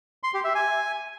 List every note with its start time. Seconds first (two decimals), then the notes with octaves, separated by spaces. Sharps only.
0.23 C6
0.34 G4
0.44 E5
0.55 G#5